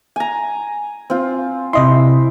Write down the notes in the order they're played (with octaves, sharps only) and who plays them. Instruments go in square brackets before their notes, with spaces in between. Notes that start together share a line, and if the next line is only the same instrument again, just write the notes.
[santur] G#5 A#5
C4 F4
[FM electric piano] C3 D#5 C6 [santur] E4